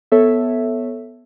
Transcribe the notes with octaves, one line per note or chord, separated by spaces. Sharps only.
B3 A4 C#5 E5